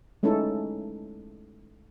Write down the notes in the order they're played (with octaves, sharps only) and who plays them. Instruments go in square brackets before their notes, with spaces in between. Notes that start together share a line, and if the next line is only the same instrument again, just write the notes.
[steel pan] G#3 A3 C#4 D#4 E4 A4